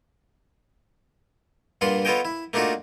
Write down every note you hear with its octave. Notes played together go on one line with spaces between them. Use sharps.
G2 A#2 F4 F#5 C6
B3 F4 A4 C#5 D#5 G5
E4
A3 A#3 D4 D#4 F4 F#4